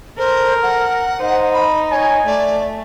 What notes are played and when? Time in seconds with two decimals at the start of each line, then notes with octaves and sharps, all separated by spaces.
0.18 A4 A#4 C5
0.63 F#5
1.20 D#4 C5
1.53 B5
1.92 C#5 G#5
2.26 A3 D5